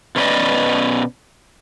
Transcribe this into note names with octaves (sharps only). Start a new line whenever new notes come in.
B2 C#4 B4 D5 D#5